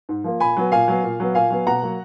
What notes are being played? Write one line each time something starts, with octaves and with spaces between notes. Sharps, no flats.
G#2
F3 A#3
A#2 G#5 B5
F#3 B3
A#2 F5 G#5
F#3 B3
A#2
F#3 B3
A#2 F5 G#5
F#3 B3
B2 F#5 A#5
F#3 A#3